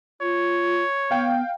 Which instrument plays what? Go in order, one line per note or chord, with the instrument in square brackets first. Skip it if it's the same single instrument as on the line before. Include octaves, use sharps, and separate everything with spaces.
[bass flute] F4 [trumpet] C#5
[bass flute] B3 [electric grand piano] F5 G5